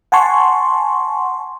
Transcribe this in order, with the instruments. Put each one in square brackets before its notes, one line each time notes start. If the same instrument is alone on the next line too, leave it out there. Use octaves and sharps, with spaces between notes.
[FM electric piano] F#5 G#5 A5 C6 C#6